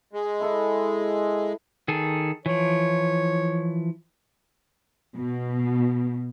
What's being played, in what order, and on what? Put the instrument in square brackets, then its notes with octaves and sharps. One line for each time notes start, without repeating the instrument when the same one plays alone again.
[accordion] G#3
[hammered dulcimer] E4 A4 E5
[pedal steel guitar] D#3 G#4 A4
[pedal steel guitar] E3 F3 [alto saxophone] C#5
[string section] B2